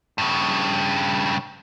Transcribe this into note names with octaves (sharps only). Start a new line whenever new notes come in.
G2 C#3